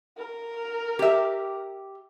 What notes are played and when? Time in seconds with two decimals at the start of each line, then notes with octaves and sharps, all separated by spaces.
0.18 A#4
0.99 G4 E5